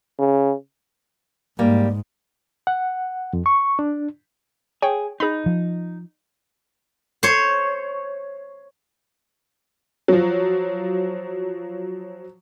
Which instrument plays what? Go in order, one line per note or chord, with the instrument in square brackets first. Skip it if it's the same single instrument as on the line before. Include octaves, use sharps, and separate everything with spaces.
[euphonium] C#3
[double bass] G#2 [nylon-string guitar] G3 A#3
[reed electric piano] F#5
F2
C#6
D4
[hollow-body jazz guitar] G#4 [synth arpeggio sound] C#5 G5
[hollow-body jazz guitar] D#4 [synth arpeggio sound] G#4 B5
[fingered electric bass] F3
[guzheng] C5 C#5
[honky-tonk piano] F3 F#3